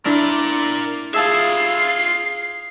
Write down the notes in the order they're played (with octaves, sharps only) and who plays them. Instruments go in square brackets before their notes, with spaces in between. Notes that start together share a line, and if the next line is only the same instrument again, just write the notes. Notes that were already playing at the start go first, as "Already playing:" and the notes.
[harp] D4 E4 [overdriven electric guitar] A#4 D5 [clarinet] C6
[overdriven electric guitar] F4 E5 [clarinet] G#4 [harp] F5 A5 E6 [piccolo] C7